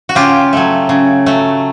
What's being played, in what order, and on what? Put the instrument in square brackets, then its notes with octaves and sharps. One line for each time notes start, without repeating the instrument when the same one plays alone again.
[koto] F#4
C#3 F4 G4
F#3 A3
C#3
F#3 A3